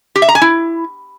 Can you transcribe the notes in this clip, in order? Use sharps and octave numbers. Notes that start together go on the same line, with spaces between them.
G4
E5
A#5
G#5
E4